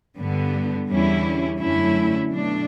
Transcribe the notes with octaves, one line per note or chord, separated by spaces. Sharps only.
G2 D3 G3 B3
E2 D3 G3 C#4 E4
F#2 D3 A3 C#4 E4
B2 F#3 A3 D4